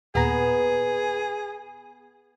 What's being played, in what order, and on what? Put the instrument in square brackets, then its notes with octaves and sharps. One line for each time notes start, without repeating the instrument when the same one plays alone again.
[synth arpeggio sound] D#2 A#2 A#5 [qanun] B3 [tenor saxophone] G#4